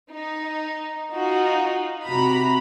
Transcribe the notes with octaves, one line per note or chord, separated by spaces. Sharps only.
D#4
D#4 F4 F#4
C3 F#4 A#5 B5